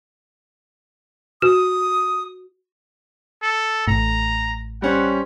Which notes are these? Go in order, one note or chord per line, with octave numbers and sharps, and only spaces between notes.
F#4 D#6
A4
A1 A2 A#5
G3 C#4 C5 F#5